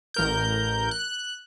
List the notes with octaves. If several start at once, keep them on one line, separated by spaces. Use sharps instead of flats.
A1 A#4 G6
F#6